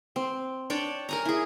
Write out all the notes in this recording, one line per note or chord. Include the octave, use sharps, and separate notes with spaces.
C4
D4 C#5 G5 A5
A#4 G#5 A#5
E4 G#4